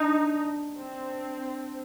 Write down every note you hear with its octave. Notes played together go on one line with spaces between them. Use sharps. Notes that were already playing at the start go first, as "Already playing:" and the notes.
Already playing: D4 D#4
C4